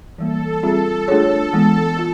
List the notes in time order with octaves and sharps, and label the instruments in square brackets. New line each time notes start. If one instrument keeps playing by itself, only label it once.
[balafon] E3 G3 A#3 [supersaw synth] A4
[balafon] G3 C4 F4 G#4 [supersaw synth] A4
[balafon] A3 D4 F4 G#4 C#5 [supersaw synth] A4
[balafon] E3 G#3 B3 [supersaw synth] A4
[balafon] F4 A4